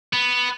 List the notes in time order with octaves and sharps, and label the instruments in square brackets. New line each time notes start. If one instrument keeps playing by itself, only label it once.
[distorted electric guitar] B3